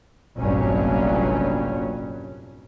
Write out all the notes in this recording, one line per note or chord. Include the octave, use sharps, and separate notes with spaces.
F1 A#1 G2 F#3 C#4